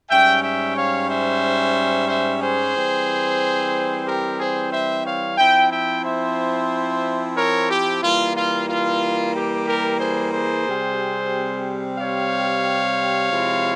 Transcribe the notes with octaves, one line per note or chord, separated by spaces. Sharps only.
G#2 G3 C#4 E5 G5
E5 G5
C#5 F5
C5 E5
C5 E5
G#4 C5
E3 G3 C4
G4 A#4
G#4 C5
C5 E5
C#5 F5
F3 C4 E4 E5 G5
E5 G5
C5 E5
A#4 C#5
G4
E3 G3 A#3 F4
F4
F4
G4
G4 A#4
G#4 C5
G#4 C5
C3 G3 C4
C#5 F5
C3 F3 G#3 C4 E4